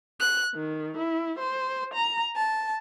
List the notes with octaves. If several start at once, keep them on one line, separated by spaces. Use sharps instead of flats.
F#6
D#3
E4
C5
A#5
A5